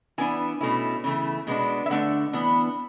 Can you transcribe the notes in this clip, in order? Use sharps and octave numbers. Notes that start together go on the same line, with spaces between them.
E3 B3 D4 G#5
B2 A3 C#4 E4
C#3 E3 A3
B2 G#3 B3 D4
E5
D3 A3 D4 F#5
E3 B3 D4